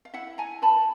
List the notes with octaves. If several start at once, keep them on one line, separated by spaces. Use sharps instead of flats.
F5
E4 E5 F#5
E4 G#5 A#5
B4 A5 B5